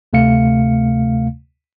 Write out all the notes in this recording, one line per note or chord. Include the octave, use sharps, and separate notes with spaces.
D2 C3 A3 F5 C#7